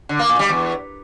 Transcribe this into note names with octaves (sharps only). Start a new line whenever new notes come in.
D3
A#3
A#2
G3
E2